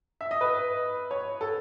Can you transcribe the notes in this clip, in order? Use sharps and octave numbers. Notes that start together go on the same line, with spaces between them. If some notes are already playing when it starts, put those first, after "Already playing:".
E5
D#5
B4
C#5
A4